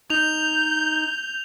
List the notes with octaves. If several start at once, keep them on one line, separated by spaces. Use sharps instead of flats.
D#4 G6 F7